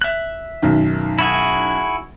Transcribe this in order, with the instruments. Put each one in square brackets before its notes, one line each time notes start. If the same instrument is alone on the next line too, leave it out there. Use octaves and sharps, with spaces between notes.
[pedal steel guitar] E5 F#6
[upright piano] B1 F#2 D#3
[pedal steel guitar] E4 F#4 G#4